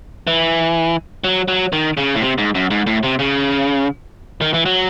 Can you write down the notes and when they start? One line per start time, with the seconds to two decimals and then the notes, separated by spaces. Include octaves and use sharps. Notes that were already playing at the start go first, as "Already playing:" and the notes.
0.27 E3
1.24 F#3
1.48 F#3
1.73 D#3
1.97 C#3
2.15 A2
2.22 C3
2.38 G#2
2.55 F#2
2.71 G#2
2.87 A2
3.03 C3
3.19 C#3
4.41 D#3
4.54 E3
4.66 F#3